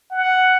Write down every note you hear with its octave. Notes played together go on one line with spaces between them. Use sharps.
F#5